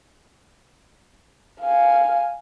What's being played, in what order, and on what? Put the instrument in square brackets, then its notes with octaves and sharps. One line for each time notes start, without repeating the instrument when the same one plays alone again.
[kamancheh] F5 G#5